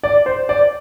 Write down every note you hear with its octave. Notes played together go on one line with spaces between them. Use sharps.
D5
C5
D5